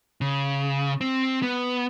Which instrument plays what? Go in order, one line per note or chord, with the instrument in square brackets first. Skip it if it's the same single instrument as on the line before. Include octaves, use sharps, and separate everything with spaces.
[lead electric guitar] C#3
C4
B3